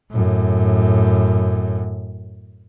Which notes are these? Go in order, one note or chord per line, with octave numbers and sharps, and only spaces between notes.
F#2 A2